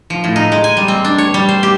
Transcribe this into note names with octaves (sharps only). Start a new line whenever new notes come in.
F3
A2
D#4
G#3
G#5
G3
C4
D4
C#5
G3
C5
G4